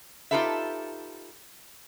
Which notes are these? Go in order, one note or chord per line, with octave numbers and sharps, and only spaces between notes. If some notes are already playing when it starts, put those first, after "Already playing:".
D#4 F4 G4 A4 B4 E5